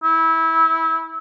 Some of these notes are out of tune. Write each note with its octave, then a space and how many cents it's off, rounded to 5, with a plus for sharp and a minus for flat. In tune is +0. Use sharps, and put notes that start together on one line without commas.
E4 -20